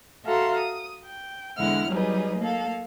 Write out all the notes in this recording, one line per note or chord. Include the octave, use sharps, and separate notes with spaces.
F#4 A4 E5 F5 A#5 C6
D#6
G5
E2 D3 G#3 E4 F#5 F6
F#3 G3 D#4 G#4 B4
A#3 A4 F5